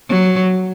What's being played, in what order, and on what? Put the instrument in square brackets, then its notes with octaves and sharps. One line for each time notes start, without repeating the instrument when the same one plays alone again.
[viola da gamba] F#3